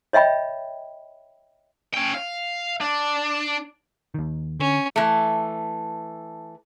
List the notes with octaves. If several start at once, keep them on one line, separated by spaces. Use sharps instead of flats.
C#5 D#5 E5 G5 B5
C#4 G5
F5
D4
D#2 D#3
D3 C#4
E3 A3